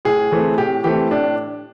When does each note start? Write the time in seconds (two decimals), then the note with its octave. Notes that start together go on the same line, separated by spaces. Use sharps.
0.05 A2 G#4
0.31 E3 A3 C4
0.57 A2 G4
0.84 E3 A3 C4 G4
1.11 A2 D4